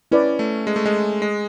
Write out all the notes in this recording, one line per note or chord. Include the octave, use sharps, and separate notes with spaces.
C#4 E4 B4 D5
A3
G#3
A3
G#3
G#3